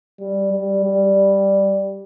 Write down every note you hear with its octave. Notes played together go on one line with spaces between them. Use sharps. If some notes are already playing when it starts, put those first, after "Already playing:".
G3
G3
G3